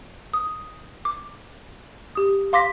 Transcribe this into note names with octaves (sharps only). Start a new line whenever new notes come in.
D#6
D6
G4 D#6
F5 C6 D6 A#6 B6